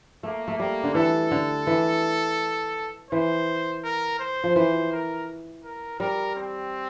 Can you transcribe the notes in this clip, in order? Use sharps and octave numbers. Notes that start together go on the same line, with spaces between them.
A3 A#3
A3
G3 A#3
D3
E3 A4
D3
E3
E3 C5
A#4
C5
F3
E3 C5
A#4
A#4
G3 A#4
C4